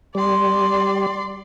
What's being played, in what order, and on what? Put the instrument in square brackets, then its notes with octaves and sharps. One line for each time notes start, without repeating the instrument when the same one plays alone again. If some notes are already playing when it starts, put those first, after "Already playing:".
[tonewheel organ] G3 [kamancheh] D5 C6